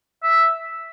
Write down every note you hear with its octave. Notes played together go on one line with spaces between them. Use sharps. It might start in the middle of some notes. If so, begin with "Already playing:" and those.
E5